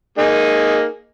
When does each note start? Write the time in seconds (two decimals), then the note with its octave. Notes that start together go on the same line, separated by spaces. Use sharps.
0.18 A#3 D#4 G#4